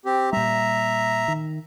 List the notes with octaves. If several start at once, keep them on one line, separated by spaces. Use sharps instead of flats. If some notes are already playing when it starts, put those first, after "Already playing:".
C4 G4
A#2 G3 E5 A#5
D#3